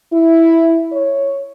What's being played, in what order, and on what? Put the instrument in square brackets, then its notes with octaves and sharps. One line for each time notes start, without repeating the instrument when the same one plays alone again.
[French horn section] E4
C#5